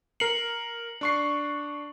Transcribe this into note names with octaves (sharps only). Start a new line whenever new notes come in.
A#4 C7 C#7 F#7
D4 C#6 C7